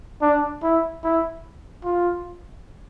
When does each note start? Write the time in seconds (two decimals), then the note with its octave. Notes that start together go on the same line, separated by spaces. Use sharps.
0.22 D4
0.63 E4
1.04 E4
1.84 F4